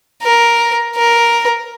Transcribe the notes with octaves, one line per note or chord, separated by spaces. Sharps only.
A#4
A#4